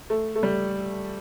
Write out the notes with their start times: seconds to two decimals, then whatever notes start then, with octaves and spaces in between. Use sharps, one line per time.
0.10 A3
0.36 A3
0.43 G3